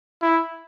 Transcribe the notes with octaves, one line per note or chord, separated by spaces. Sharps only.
E4